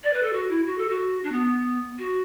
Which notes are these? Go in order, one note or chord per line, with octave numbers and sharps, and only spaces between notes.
D5
B4
A4
F#4
E4
F#4
A4
F#4
D4
B3
F#4